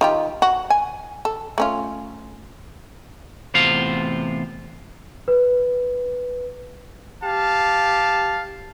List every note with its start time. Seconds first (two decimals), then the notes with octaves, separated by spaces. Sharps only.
0.01 D#3 F4 G4
0.42 F#4
0.70 G#5
1.25 A4
1.58 A3 C#4 F4
3.54 E2 A2 C3 F4 C5 F5
5.28 B4
7.23 G4 F5 A5